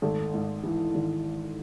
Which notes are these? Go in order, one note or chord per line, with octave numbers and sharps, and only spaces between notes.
G#1 A3
G#2
E3
G#1